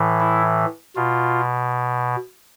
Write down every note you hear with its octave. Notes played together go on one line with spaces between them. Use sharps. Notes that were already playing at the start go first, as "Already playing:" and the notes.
Already playing: A2 E3
E4
B2 F4